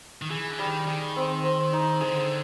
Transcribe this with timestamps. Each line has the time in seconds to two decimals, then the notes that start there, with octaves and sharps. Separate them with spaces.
0.22 D#3
0.30 E3 G#4
0.51 D3
0.58 D#3 G3
0.87 D#3 G#4
1.16 C4
1.44 C4
1.73 D#4
2.01 D3 G#4